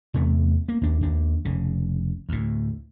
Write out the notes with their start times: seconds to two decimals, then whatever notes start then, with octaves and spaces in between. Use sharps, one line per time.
0.14 E2 C3 A3
0.69 A#3
0.81 D#2 D4
1.01 D#2 D4
1.45 F1 C#3
2.29 D2 A2